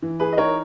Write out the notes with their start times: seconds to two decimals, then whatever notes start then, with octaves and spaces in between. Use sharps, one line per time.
0.02 E3
0.20 G#4 B4
0.33 D#5
0.37 D#4 A#4 C#5